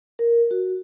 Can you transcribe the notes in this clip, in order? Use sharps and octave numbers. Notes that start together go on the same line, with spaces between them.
A#4
F#4